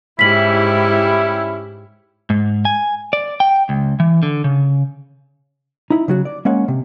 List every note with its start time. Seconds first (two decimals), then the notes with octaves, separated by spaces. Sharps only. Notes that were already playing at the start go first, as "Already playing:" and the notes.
0.19 G#2 G3 C#4 E4 G4 B6 F#7
2.30 G#2
2.65 G#5
3.13 D5
3.40 G5
3.69 C#2
4.00 E3
4.23 D3
4.44 C#3
5.90 D#4 E4
6.08 C#3 F#3 F#4
6.25 D5
6.45 G#3 A#3 C#4 F#5
6.68 C3